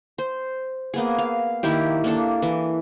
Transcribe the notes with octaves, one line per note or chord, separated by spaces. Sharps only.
C5
A#3 B3 G#4
F5
D#3 A#3 E4 G4
A#3 D4 A4
E3